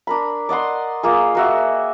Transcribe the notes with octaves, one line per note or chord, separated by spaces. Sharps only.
D4 A#4 B5
D5 D#5 F#5 C6
A#3 F4 G#4
A#3 F#4 E5